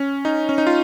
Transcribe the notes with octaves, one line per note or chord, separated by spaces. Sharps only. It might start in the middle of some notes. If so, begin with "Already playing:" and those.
Already playing: C#4
D#4
C#4
D#4
F4